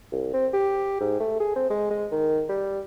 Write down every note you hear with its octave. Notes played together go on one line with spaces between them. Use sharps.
C2
C4
G4
G#2
A3
G#4
C4
G#3
G#3
D#3
G3